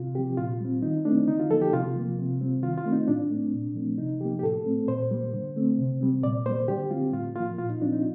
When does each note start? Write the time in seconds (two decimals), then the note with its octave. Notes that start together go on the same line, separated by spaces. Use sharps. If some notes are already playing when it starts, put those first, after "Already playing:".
Already playing: C3 F4
0.15 F3 C4 G4
0.37 A#2 F4
0.61 G3 C4
0.82 D#3 D#4
1.05 A3 C4 D4
1.28 D3 D#4
1.40 F4
1.50 F3 A#3 A4
1.62 G4
1.72 C3 F4
1.96 F3 A#3
2.19 C3
2.41 G3 C4
2.62 D#3 F4
2.78 F4
2.85 A3 C4
2.93 D#4
3.08 A2 D4
3.30 A3 C4
3.54 A#2
3.75 F3 A3 C4
3.98 C3 D#4
4.20 F3 A#3 G4
4.39 G4
4.43 A2 A4
4.66 A3 C4
4.88 A#2 C5
5.11 G3 A#3
5.33 D3
5.56 A3 C4
5.79 C3
6.01 G3 C4
6.23 A#2 D5
6.46 G3 A#3 C5
6.68 D3 G4
6.91 G3 C4 F4
7.13 A2 F4
7.35 F3 A#3 F4
7.58 A#2 F4
7.70 D#4
7.81 F3 C4 D4
7.93 D#4